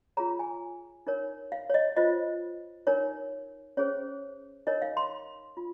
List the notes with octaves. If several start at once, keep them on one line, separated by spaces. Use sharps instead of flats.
F4 G#4 C#5 A#5
G#5
D#4 A#4 C#5
F5
C#5
D#5
F4 C5 D#5
D#4 A#4 C#5
C#4 G#4 C5 C#5
D#4 A#4 C#5 D#5
F5
C6
F4